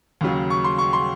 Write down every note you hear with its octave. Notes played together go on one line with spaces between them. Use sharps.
D#2 C#3 F#3
C#6
C6
C#6
C6